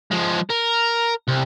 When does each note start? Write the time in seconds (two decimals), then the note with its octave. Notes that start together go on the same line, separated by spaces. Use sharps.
0.11 F3 G#3
0.50 A#4
1.28 C2